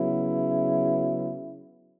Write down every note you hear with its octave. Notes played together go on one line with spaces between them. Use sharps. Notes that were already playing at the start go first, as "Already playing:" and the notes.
Already playing: C#3 F#3 B3 E4